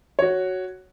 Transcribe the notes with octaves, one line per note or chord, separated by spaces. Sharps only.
F#4 C#5